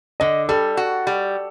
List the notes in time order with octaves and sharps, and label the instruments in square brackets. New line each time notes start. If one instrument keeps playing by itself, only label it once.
[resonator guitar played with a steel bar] D3 [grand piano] D#5
[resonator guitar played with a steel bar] G3 [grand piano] A4
[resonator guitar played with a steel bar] F#4
G3